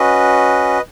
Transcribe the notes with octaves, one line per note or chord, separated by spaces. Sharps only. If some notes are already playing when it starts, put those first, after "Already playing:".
Already playing: C#4 F#4 B4 D#5